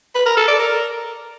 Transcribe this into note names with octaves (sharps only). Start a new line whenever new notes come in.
B4
A#4
A4
D5
A#4